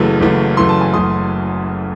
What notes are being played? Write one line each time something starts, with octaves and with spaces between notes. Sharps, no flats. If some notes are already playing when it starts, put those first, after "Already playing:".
Already playing: F#1 F#2 E3 A3
F#1 F#2 E3 A3
F#1 F#2 E3 A3 C6
A5
G#5 C6
F#1 F#2 E3 A3 C6 D#6